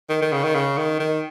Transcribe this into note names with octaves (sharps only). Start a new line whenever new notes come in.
D#3
D#3
C#3
D#3
C#3
D#3
D#3